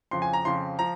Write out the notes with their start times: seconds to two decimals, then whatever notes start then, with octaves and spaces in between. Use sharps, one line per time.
0.11 F2 C#3 F3 C6
0.22 G#5
0.33 A#5
0.45 F2 C#3 F3 C6
0.79 F3 A#5